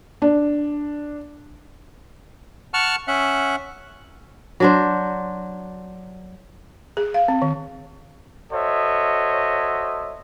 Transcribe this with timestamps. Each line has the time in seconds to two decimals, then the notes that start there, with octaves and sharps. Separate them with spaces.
0.22 D4
2.74 F#5 A5 C#6 F6
3.08 C#4 E5 F#5
4.60 F#3 D4 C5
6.97 G#4
7.14 F5
7.28 C4
7.42 D#3
8.52 F#4 A4 C5 C#5 D#5 E5